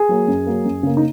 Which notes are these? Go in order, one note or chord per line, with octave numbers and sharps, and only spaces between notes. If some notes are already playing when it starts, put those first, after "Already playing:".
Already playing: G#4
F#3 A#3
F#2
F#3 A#3
F#2
C#3 A#3
D#4